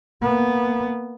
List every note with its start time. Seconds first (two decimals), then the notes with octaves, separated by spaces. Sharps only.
0.22 A#3 B3